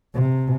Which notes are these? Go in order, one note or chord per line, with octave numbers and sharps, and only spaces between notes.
C3